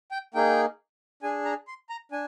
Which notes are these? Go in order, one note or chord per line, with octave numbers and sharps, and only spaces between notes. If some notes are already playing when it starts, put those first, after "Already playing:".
G5
A#3 D#4 G#4 G5
D4 G#4 G#5
A#5
C6
A#5
D4 G#5